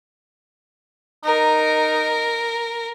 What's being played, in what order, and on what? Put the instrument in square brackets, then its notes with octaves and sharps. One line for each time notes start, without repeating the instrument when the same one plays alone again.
[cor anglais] D#4 [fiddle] A#4